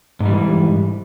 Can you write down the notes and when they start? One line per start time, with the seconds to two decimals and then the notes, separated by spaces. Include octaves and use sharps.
0.20 G#2
0.25 G3
0.30 E3